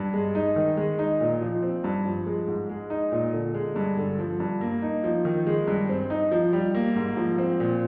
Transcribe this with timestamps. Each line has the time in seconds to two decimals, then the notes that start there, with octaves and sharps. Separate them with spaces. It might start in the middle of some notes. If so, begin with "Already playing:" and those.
Already playing: G2
0.14 G#3
0.35 D#4
0.56 D#3
0.77 G#3
0.99 D#4
1.21 A#2
1.42 F3
1.63 C4
1.84 G2
2.05 F3
2.26 G#3
2.48 G#2
2.69 G#3
2.90 D#4
3.12 A#2
3.33 D3
3.54 G#3
3.76 G2
3.97 D3
4.19 F3
4.40 G2
4.61 A#3
4.82 D#4
5.04 F3
5.25 D#3
5.47 G#3
5.67 G2
5.89 C4
6.10 D#4
6.32 F3
6.53 G3
6.75 A#3
6.96 G#2
7.17 F3
7.38 C4
7.60 A#2